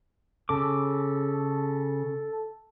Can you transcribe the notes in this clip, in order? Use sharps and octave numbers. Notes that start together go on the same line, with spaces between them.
C#3 A4 D6